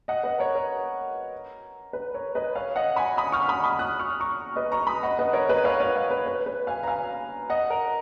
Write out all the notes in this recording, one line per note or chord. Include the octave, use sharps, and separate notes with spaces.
D#5 F#5
B4 D#5
A#4 C#5
A#4
B4
A#4 C#5
B4 D#5
C#5 F5
D#5 F#5
G#5 B5
B5 D#6
C#6 F6
B5 D#6
B5 D#6
D#6 F#6
C#6 F6
A#5 C#6
B4 D#5
A#5 C#6
B5 D#6
D#5 F#5
B4 D#5
A#4 C#5
B4 D#5
C#5 F5
C#5 F5
C#5 F5
B4
B4
B4
F5 G#5
A#5
F5 G#5
D#5 F#5
A#4